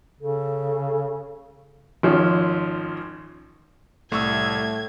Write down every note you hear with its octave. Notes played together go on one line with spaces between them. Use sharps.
C#3 A4
G#1 F3 C#4
C2 A2 A3 C#6 E6 G#6